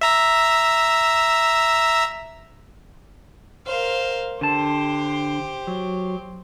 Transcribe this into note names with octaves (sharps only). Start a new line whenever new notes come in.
E5 A#5 E6
A#4 C5 F5
D3 G4 C5 A5
F#3